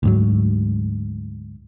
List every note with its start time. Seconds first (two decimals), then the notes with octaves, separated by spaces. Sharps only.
0.03 D2 G#2 F#3